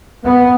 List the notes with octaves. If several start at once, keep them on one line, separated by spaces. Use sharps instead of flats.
B3